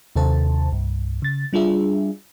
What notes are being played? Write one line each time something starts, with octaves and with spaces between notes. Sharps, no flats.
D#2 C3 A4 C5 A5
C2 G2
C#3 A6
G3 D4 F4 G#4 E5